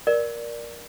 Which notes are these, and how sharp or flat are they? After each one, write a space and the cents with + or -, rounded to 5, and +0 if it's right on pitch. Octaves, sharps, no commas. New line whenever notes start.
A#4 +20 D5 +0